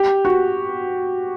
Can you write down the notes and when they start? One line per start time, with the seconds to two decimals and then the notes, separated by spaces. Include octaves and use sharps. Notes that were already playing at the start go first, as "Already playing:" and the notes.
Already playing: G4
0.25 F#4